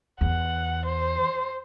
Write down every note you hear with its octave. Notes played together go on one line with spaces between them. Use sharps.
E2 F#5
C5